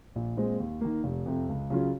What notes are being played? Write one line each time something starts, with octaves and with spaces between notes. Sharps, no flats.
A#1
A#2 G#3 C4
D#2
D#3 A#3
F1
F2 C3
C#2
C#3 F#3 C#4 F4